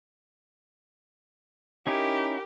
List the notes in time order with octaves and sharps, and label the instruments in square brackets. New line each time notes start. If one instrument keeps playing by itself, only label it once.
[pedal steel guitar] C#4 D#4 E4 [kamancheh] G4 A#4